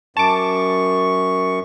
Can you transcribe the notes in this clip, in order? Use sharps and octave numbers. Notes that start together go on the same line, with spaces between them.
F#2 A5 C#6 D6